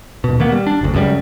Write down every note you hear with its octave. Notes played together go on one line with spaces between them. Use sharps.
D#1 B2
D#3 A#3 B3
G3
D4
F#1 D2
C#2 F#2 C#3 G3